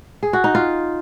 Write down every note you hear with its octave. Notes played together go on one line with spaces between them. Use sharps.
G#4
F#4
D#4
F4